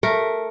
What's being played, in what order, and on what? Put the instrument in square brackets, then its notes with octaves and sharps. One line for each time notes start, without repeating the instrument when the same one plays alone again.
[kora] A3 A#4